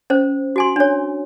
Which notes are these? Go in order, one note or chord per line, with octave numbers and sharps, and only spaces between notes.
C#4 C5
F#4 G#5 C6
D4 C#5